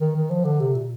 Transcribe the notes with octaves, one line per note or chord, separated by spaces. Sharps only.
D#3
D#3
F3
D3
C3
A#2